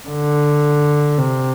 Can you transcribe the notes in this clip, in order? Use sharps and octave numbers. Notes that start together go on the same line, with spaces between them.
D3
C3